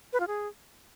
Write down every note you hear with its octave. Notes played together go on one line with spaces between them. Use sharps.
B4
F4
G#4